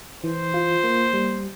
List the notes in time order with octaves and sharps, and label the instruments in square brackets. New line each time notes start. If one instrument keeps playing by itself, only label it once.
[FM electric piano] E3 [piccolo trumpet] C5
[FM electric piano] F4
A#3
G3